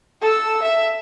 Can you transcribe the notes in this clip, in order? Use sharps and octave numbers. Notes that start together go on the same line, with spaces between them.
A4 E6
E5